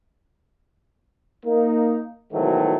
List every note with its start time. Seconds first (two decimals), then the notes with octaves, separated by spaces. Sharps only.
1.46 A#3 D#4
2.33 G#2 B2 D#3 E3 F#3 A3